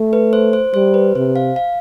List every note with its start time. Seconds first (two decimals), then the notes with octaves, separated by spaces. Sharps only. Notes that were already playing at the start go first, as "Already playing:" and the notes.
Already playing: A3
0.13 B4
0.33 C5
0.53 C5
0.74 G3 C5
0.94 B4
1.16 C3 C5
1.36 F5
1.56 F5